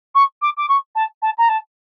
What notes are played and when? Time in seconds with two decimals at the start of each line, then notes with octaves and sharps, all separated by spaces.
0.14 C#6
0.41 D6
0.57 D6
0.68 C#6
0.95 A5
1.22 A5
1.38 A#5
1.49 A5